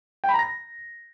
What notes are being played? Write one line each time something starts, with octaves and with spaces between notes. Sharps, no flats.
G5
B5
A#5
A#6